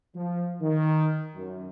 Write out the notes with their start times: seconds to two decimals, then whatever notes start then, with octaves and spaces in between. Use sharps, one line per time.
0.15 F3
0.62 D#3
1.35 F#2